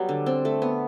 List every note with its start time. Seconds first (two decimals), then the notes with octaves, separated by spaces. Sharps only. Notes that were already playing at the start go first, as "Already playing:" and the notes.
Already playing: F#3 G3 B3
0.09 D3
0.26 C4
0.45 A3
0.62 B3